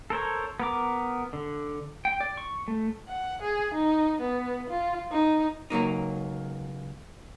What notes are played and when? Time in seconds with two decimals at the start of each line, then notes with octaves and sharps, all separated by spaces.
0.10 A4 A#4 C5 C#5
0.60 B3 A#4 D6
1.33 D3
2.05 G5
2.20 D5
2.37 C#6
2.68 A3
3.09 F#5
3.42 G#4
3.74 D#4
4.21 B3
4.70 F4
5.12 D#4
5.70 C#2 F#3 A#3 D#4